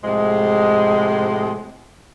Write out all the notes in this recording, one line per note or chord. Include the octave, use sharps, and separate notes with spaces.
A2 C3 F3 G#3